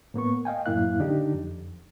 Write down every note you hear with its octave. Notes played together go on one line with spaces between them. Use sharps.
A2 A#3 B3 C#6
D#5 F5 G5 G#5
F#2 A2 A#3 E4 F5 F#6
D3 D4 D#4 G4
F2